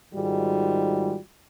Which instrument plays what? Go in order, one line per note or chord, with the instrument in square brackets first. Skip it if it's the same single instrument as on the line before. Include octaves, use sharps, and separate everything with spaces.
[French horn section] G#2 D#3 G3 G#3 F4 F#4